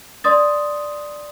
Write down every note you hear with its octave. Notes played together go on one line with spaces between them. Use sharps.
D5 C6 D#6 A6